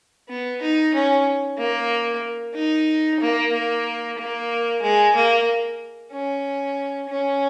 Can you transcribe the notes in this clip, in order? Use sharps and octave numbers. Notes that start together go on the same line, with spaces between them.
B3
D#4
C#4
A#3
D#4
A#3
A#3
A#3
G#3
A#3
C#4
C#4